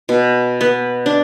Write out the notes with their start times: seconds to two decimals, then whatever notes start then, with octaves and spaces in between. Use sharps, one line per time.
0.09 B2
0.61 B3
1.06 D4